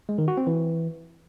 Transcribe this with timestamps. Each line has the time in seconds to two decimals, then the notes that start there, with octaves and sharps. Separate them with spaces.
0.09 G#3
0.18 D#3
0.28 F#4
0.37 C4
0.47 E3